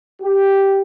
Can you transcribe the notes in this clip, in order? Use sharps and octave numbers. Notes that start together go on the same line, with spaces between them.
G4